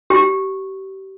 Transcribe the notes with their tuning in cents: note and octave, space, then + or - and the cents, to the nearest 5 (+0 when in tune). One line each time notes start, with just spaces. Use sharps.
G4 -30